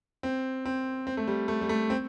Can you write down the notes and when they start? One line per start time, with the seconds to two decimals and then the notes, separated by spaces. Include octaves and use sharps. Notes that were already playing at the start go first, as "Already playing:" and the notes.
0.23 C4
0.65 C4
1.07 C4
1.17 A3
1.28 G3
1.48 A3
1.61 G3
1.69 A3
1.90 C4